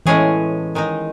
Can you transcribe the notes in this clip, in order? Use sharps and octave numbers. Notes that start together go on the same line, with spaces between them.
A2 E3 G#3 C#4 G#4
D#3 G#3 D#4